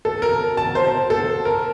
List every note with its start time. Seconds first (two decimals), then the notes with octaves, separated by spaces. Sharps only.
0.05 A4
0.22 A#4
0.57 A5
0.75 C5
1.10 A4
1.45 A#4